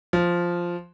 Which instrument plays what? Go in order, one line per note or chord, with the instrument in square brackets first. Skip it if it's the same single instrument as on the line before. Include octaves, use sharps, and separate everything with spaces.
[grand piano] F3